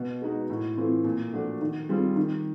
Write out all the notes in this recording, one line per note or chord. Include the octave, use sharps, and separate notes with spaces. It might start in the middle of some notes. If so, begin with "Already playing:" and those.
Already playing: B2
G#3 B3 D#4 F#4
A2
E3 A3 C4 F4
A#2
F3 A3 D4 F#4
D#3
G3 C4 F4 G#4
D#3